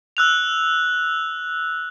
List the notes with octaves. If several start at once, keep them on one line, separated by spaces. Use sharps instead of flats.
E6 F#6 F7